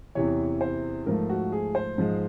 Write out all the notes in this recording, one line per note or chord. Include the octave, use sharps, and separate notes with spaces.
E2 C3 E3 C#5
C5
G#2 F3 A3 A#4
F#4
G#4
C5
G#2 F3 G#3